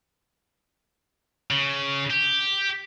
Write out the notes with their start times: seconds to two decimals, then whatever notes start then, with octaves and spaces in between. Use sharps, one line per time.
1.51 C#3
2.10 G4